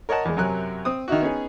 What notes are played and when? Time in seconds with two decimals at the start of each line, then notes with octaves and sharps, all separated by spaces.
0.09 A#4 C#5 D#5 F#5 A5
0.25 E2 G#3
0.37 F#2 C3 F#3 A#4 G#5 F#6
0.85 C4 D#6
1.08 D#3 D#4 E4 F#4
1.21 B3 C#4 D#4 G#4